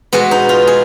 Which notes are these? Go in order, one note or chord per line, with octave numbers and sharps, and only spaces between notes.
B2 G#3 B3 F#4
D#4
F4
G#4